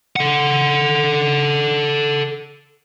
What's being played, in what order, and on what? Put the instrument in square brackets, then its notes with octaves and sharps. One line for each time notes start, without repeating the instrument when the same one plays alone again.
[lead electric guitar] A4 F#5